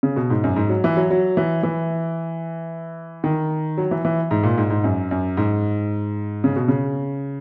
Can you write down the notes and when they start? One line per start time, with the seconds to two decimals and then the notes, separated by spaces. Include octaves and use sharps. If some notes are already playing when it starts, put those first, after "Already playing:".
0.03 C#3
0.16 B2
0.30 G#2
0.44 F#2
0.56 G#2
0.69 F#3
0.84 E3
0.97 F#3
1.10 F#3
1.37 E3
1.63 E3
3.24 D#3
3.78 F#3
3.91 E3
4.05 E3
4.31 G#2
4.43 A#2
4.58 G#2
4.70 G#2
4.84 F#2
5.11 F#2
5.37 G#2
6.44 C#3
6.56 B2
6.68 C#3